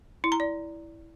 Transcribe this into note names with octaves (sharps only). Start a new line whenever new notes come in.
E4
A#5
D5